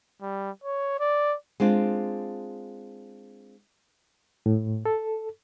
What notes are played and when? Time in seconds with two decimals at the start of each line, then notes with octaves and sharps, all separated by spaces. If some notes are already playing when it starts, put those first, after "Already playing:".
0.22 G3
0.64 C#5
1.00 D5
1.60 G#3 C4 D4 F4
4.46 A2
4.85 A4